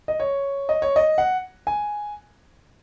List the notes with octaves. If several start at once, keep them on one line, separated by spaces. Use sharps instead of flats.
D#5
C#5
D#5
C#5
D#5
F#5
G#5